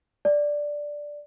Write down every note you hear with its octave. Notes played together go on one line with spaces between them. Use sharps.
D5